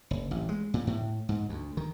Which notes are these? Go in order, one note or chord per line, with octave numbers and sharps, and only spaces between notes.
F#1
A1
G#3
A#2
A2
G#2
D2
D#3